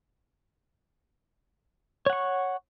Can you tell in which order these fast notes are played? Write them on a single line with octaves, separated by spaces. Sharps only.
C#5 F#5 C#6